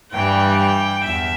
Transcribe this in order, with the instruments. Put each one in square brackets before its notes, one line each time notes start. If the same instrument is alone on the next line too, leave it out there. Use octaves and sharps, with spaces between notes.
[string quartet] G2 E3 G3 G5
G5
E2 E5